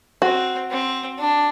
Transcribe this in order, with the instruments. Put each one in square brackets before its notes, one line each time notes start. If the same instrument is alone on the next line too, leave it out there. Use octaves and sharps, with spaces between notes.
[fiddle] C4 [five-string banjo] F#4
[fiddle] C4
D4